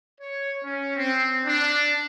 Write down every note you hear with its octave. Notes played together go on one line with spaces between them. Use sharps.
C#5
C#4
C4
D4